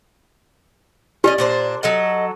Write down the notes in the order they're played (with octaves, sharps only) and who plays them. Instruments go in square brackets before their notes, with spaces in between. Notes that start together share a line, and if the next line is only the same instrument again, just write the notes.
[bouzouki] C#4 C5 D#5 [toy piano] G4 [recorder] D5
[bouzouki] A#2 D4 C5
[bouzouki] F#3 A4 F#5 [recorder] D#5